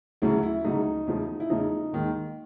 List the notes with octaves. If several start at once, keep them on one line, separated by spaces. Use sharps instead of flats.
D2 C#3 F#3 A3 E4
E4
D2 C#3 F#3 A3 D#4
E2 C#3 F3 A3
E4
E2 C#3 F3 A3 D#4
D#2 D#3 G#3